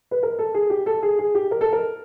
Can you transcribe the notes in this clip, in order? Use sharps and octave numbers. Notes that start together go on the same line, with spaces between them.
B4
A#4
A4
G#4
G4
A4
G#4
G#4
G4
A#4
A4
A#4